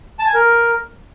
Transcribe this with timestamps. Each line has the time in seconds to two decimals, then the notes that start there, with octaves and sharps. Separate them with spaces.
0.19 A5
0.27 G#5
0.34 A#4